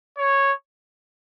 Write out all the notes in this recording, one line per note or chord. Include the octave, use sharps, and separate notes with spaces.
C#5